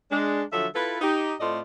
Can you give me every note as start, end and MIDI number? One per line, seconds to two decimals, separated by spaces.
0.10 0.43 56
0.10 0.43 62
0.53 0.66 50
0.53 0.66 53
0.53 0.66 54
0.53 0.66 69
0.53 0.66 76
0.75 0.98 64
0.75 0.98 65
0.75 0.98 69
0.75 0.98 71
1.01 1.33 63
1.01 1.33 67
1.40 1.59 45
1.40 1.59 57
1.40 1.59 60
1.40 1.59 65
1.40 1.59 74
1.40 1.59 75